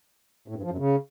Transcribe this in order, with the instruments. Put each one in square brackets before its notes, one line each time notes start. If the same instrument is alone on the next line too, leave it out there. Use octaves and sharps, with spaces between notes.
[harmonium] A2
G2
F3
F#2
C#3